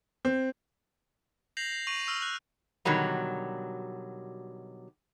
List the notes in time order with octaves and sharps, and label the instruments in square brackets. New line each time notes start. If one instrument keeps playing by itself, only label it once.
[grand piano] C4
[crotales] G6 A#6 C7 F7 F#7
C7
C#6 A#6 D#7 F7 F#7
C#6 E6 F6
F#6
[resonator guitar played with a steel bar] B2 D3 D#3 F#3 G3